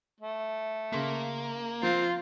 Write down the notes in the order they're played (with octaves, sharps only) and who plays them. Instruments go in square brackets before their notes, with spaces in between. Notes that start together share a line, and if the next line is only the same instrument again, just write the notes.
[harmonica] A3
[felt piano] C#3 C6 B6 [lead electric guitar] A#3
[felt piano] F3 [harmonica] C4 [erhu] F4